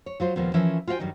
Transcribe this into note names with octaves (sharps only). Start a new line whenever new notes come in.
C#5
F#3 F4 C5
D#2 A#2 F3 G3 A#3 B3
E3 F3 C#4 E4 A#4 E5
F4 F#4 C5 F5 G5 G#5
G2 D#3 F#3 G3 D#4